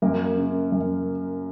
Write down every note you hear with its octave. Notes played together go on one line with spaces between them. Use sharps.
F#2 A#3
C#3
F#2